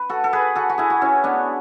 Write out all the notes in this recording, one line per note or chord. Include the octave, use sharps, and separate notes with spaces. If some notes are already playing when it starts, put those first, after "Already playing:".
Already playing: B4
F#4 A4
A4
G#4 B4
F#4 A4
F#4
E4 G#4
F#4
C#4 E4
B3 D4